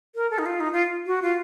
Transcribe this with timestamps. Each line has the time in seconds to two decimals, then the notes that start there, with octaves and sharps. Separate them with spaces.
0.15 A#4
0.31 A4
0.39 D#4
0.46 F4
0.60 D#4
0.72 F4
1.06 F#4
1.22 F4